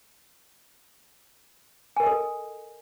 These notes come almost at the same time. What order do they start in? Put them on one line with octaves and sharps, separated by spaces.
G#5 A#4 D#5 A4